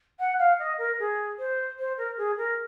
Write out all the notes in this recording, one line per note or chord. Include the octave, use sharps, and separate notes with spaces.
F#5
F5
D#5
A#4
G#4
C5
C5
A#4
G#4
A#4